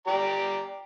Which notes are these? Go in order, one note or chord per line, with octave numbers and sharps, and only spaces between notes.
G4 D5 A#5